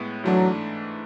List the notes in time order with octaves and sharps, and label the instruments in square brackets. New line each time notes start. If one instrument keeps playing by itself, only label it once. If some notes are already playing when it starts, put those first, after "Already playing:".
Already playing: [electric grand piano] A2 G#3 B3 E4
[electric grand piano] G#2 E3 A3 D4 [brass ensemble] F#3